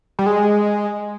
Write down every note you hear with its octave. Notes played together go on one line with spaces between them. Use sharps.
G3
G#3